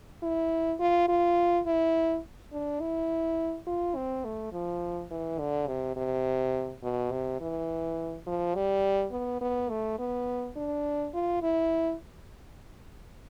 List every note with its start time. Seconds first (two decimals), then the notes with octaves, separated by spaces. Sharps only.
0.23 E4
0.80 F4
1.09 F4
1.66 E4
2.52 D4
2.80 E4
3.67 F4
3.96 C4
4.25 A3
4.53 F3
5.11 E3
5.39 D3
5.68 C3
5.96 C3
6.83 B2
7.11 C3
7.41 E3
8.27 F3
8.55 G3
9.12 B3
9.41 B3
9.70 A3
9.99 B3
10.56 D4
11.14 F4
11.42 E4